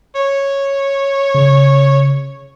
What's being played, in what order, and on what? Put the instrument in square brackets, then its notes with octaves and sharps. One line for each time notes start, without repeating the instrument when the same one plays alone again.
[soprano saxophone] C#5
[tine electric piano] C#3